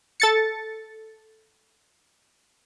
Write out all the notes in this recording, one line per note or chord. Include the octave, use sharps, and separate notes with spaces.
A4 A6 C#7